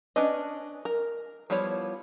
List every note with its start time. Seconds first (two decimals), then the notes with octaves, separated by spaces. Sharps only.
0.16 C#4 D4 B4 D5 D#5
0.85 A#4
1.50 F3 G3 B3 E4 C#5